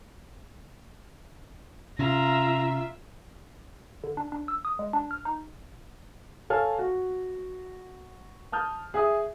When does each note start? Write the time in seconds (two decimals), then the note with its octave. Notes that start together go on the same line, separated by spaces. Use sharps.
1.99 C3 C#4 F4 E5 A#5
4.04 D3
4.17 D4
4.32 D4
4.48 E6
4.65 D#6
4.79 G#3
4.93 D4
5.11 F6
5.25 D#4
6.50 A4 C#5 F5 G#5 F6
6.79 F#4
8.52 A5 D#6 F6 G6
8.94 G#4 E5 D#6